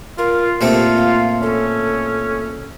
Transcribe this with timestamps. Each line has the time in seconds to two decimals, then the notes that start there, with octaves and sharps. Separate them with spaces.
0.18 F4 A#4
0.61 A#2 A3 C4 F4 G4
0.97 F5
1.43 C#4 A4